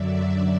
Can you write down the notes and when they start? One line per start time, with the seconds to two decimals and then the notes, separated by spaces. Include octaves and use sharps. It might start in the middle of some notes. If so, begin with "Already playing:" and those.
Already playing: F#2 D3 F#3 D5 E5